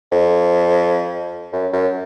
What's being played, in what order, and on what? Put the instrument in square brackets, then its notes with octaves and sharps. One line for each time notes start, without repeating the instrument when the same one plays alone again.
[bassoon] F2
F#2
F#2